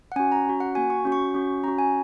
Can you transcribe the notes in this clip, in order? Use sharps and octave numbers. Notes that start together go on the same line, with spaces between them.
F#5
C#4 F#4 G#5
A#5
C#4 F#4
F#5
A#3 F#4 G#5
C#6
C#4 F#4
C#6
C#4 F#4
C#4 F#4 A#5
G#5